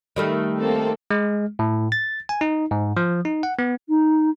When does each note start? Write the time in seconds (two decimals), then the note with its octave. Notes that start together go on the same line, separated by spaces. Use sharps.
0.16 D#3 G3 A3
0.59 A#3 C4 A4
1.11 G#3
1.59 A2
1.92 A6
2.29 G#5
2.41 D#4
2.71 G#2
2.97 F3
3.25 D#4
3.43 F#5
3.59 B3
3.89 D#4